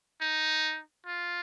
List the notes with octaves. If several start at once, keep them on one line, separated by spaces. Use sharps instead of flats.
D#4
F4